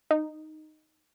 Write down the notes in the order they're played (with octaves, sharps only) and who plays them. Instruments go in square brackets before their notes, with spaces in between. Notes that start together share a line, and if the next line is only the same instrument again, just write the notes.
[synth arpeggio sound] D#4